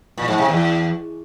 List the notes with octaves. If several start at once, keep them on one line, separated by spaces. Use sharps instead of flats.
A#2
G#2
C3
E2